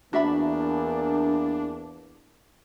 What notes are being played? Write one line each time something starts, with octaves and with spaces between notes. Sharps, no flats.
E2 E3 A#3 D4 F#4 E5 B5